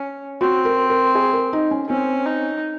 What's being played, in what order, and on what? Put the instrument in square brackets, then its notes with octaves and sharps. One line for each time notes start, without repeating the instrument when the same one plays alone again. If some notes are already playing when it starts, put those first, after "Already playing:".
Already playing: [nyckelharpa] C#4
[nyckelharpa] C4 [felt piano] F#4
[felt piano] A#4
A#4
G#4
A#4
D#4
C#4
[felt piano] C4 [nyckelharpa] C#4
[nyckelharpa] D#4